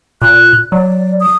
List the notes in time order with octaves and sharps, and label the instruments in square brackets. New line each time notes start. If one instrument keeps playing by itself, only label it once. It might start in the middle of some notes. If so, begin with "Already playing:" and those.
[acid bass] A#2 [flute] F#6
[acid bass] F#3 [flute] D5
[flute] D#6